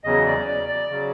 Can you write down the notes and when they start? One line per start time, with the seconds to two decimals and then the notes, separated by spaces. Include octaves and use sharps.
0.04 E2 C#3 F#3 D#5
0.26 D5
0.48 D5
0.69 D5
0.90 C#3 F#3